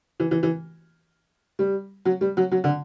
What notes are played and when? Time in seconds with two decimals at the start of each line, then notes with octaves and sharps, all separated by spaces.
0.20 E3
0.31 E3
0.43 E3
1.59 G3
2.05 F#3
2.21 G3
2.37 F#3
2.52 F#3
2.64 D3